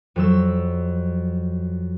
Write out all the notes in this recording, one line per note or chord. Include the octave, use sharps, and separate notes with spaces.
F2 F#3 E6